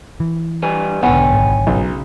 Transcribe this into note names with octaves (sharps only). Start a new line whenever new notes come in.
E3
G3 B4 G#5
B1 G#2 D3 B3 C#5 G5 G#5
G#1
B1 C#3